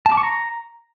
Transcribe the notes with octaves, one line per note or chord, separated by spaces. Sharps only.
A5
D6
C#6
A#5